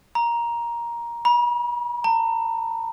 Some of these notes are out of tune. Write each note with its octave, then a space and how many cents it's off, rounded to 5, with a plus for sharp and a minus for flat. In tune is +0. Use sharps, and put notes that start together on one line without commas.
A#5 +10
B5 -45
A#5 -45